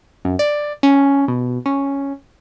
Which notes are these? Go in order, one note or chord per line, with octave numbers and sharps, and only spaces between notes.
F#2
D5
C#4
B2
C#4